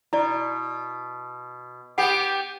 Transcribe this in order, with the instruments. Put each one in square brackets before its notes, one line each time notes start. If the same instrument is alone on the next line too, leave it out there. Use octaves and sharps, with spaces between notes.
[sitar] B2 [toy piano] E4 D5
[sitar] B3 G4 [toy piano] F#5 G5